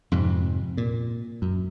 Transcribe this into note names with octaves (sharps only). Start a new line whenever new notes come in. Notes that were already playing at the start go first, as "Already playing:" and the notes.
F2 G#2 C3
A#2
F#2